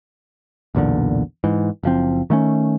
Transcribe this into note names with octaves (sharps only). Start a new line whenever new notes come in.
B1 E2 A#2 D3
G#2 E3
F#1 F3 C4
D#3 A3 B3 C#4